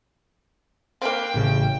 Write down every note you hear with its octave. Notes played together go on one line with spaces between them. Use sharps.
A#3 C4 B4 F5 G5 D6
A1 C#3